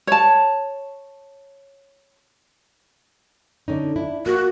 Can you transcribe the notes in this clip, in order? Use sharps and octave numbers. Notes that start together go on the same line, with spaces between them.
C#5 A5
D3 C#4 D#4
D4 E4
A#3 F#4